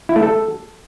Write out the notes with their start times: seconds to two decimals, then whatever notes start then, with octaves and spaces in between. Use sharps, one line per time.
0.09 E4
0.16 A3
0.23 A4